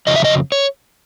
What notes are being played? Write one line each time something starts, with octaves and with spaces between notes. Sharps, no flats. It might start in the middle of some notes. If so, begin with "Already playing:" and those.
F2 C#3 F#3 D#5
E5
D#5
C#5